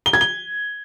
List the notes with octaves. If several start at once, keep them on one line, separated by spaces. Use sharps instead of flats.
G7
G#6
G7